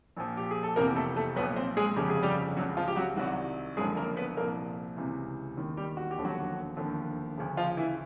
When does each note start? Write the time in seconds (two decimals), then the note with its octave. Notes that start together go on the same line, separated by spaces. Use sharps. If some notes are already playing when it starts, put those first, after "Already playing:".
0.17 A#1 A#2 F3
0.37 G4
0.51 G#4
0.63 A4
0.76 F1 E2 C3 F3 A#3 A#4
0.96 A3 A4
1.16 A3 A4
1.36 B1 A#2 F3 B3 B4
1.56 C4 C5
1.77 G#3 G#4
1.96 G1 F2 C#3 F3 G4
2.10 G#4
2.23 G3 G4
2.57 C#2 C#3 F3 F#3 F#4
2.77 F3 F4
2.88 G4
2.96 F#3 F#4
3.16 C2 C3 D#3 F#3 F#4
3.77 F#1 F#2 D3 F3 G#3 G#4
3.97 A#3 A#4
4.17 B3 B4
4.37 C2 A#2 F3 A#3 A#4
4.96 C#2 C3 E3
5.57 E1 D#2 D#3
5.77 G3 G4
5.97 F#4
6.11 G4
6.18 E1 D#2 D3 F3
6.25 F#3 F#4
6.77 E1 D#2 D3 F3
7.37 D2 C#3 F3
7.57 F3 F4
7.77 E3 E4